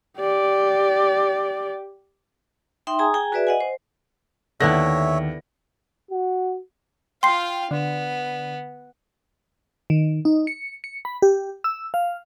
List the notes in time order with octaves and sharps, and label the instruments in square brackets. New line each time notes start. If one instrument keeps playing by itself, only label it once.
[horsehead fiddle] G4 D5
[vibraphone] D#4 E5 G5 C6
G#4 G#5 A#5 D#6
G#4 G5 G#5 A#5
F#4 G#4 B4 D5 E5
D#5 F#5 G#5
C5
[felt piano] D#2 A#6 [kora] D3 B3 E4 [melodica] C#5 E5
[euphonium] F#4
[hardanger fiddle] F4 F5 [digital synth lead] G5 [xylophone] C6 C7
[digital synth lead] D3 [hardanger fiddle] B3
[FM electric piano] D#3
D#4
C#7
C#7
B5
G4
E6
F5